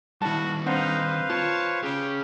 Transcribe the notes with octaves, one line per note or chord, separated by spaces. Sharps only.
D#3 G3 E4 F#4 A5
C4 D4 D#4 B4 C5 F5 F#5
F4 C#5 A5
C#4 G4 G#4